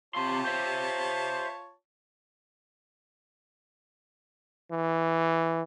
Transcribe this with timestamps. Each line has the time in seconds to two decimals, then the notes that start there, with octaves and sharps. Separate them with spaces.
0.15 C3 F4 C#5 A5 C6
0.45 C5 E5
4.72 E3